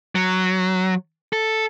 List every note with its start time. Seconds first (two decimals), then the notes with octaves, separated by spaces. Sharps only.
0.15 F#3
1.33 A4